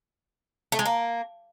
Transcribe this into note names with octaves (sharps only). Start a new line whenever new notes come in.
A3
G#3
A#3